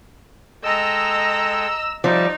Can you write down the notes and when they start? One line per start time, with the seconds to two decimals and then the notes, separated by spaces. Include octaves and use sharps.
0.64 G#3 A4 D#5 G5 A#5 E6
2.04 F3 G3 D#4 D5 E5 A5